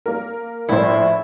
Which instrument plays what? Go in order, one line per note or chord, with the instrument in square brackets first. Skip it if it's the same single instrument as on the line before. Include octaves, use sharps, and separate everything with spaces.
[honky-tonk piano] A#3 A#4
[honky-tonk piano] A#1 A2 C5 [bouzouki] E4